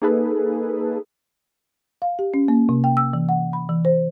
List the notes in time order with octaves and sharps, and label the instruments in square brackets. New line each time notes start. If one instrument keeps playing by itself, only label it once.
[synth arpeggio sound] A#3 D#4 G#4 A4 B4
[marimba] F5
G4
C#4
A#3
C3
G5
E6
E3
F#5
B5
E3
C5